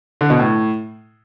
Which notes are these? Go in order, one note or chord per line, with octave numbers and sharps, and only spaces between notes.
D3
B2
A2